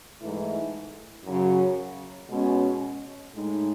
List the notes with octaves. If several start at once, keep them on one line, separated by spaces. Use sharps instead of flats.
G#2 E3 A3 E4
F#2 C#3 F#3
B2 G#3 C#4
A2 G#3 D#4